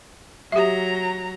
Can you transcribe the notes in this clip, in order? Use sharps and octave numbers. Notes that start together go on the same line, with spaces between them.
F#3 G4 E5 A#5